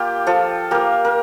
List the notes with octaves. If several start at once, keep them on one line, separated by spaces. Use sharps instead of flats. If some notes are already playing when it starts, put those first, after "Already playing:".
Already playing: A#3 F4 G4
F3 F4 A4
A#3 F4 G4 A#4
A#4